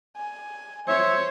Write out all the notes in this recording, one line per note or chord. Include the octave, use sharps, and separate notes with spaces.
G#5
C5 C#5 E5